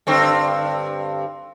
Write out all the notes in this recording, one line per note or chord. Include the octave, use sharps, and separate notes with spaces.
G2 D3 C4